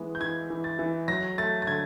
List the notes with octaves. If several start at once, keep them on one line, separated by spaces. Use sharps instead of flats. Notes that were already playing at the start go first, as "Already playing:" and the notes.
Already playing: E3 G#3 B3
G6
E3 G#6
E3
A6
E3
F#3 A#6
A3 A6
A6
D3 G#6